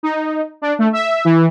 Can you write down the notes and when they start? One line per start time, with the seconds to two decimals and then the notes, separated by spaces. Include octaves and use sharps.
0.03 D#4
0.62 D4
0.79 A3
0.93 E5
1.25 E3